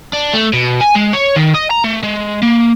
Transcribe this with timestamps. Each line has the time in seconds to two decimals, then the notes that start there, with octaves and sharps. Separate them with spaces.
0.13 D4
0.34 A3
0.53 B2
0.81 G#5
0.95 G#3
1.13 C#5
1.36 D#3
1.54 D#5
1.71 A#5
1.84 A3
2.03 G#3
2.42 A#3